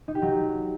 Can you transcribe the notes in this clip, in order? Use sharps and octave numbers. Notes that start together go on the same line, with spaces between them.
D#4
G4
F#3